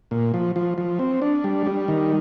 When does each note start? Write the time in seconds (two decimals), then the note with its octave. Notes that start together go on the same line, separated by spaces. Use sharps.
0.11 A#2
0.34 F3
0.56 F3
0.78 F3
0.99 C4
1.22 D4
1.44 G3
1.67 G3
1.88 D#3